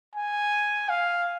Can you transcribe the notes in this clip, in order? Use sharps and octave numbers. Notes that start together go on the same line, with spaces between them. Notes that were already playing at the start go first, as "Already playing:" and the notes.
G#5
F5